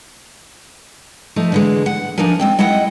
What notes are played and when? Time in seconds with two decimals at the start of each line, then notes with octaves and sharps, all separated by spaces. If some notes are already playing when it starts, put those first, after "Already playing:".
1.36 F3 A3 D#4
1.52 D3 E3 G#3
1.86 F#5
2.18 D2 F3 D4 D#4 A#4 G#5
2.40 G#3 C4 G5
2.59 G#3 E4 D#5 F#5 G5